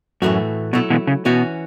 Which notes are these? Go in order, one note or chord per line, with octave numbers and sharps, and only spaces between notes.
F#2 A2 E3 A3 F#4
B2 F#3 A3 E4
B2 E3
C#3
B2 E3 C#4 F#4